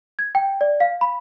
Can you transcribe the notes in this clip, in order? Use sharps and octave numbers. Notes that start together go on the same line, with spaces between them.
G#6
G5
D5
F5
B5